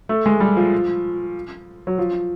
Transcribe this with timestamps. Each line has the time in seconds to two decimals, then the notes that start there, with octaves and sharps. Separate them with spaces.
0.09 A3
0.26 G#3
0.40 G3
0.57 F3
1.87 F#3
1.98 F3